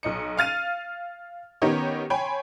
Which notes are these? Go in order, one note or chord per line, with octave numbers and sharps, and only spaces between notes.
B1 D#5 C#7
F5 F6 A6 D#7
D#3 B3 C#4 D#4 G4 C#5
C#5 G5 G#5 B5 C6